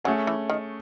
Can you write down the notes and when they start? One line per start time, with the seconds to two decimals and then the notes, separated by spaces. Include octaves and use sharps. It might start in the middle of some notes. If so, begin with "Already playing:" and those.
0.04 F#3 A3 C#4 G#4
0.27 E3
0.50 D#3